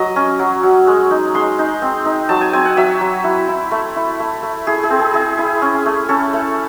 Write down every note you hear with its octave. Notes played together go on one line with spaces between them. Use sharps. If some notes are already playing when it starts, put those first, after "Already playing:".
Already playing: F#3 D#5
C#4
F#3
F#3
G#3
D#4
G#3 C6
D#4
C4
D#4
F#3 A5
G#5
C4 G#5
F#5
F#3 E5
F#3
E4
E4
A3
E4
A3
A3
E4 G#4
G#4
C4
G#4
E4 G#4
E4
C#4
A3
C#4 A4
A3